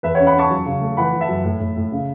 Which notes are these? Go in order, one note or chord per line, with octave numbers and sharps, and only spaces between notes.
E2 B4 E5
C#4 C#5 F#5
F#5 B5
C#4 A5 C#6
F#3
C#3
A3
E3 F#5 B5
E3
E5 A5
F#2
A2
A2
A2
C#3